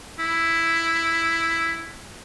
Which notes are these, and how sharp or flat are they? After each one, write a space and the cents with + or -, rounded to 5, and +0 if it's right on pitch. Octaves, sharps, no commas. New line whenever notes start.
E4 +5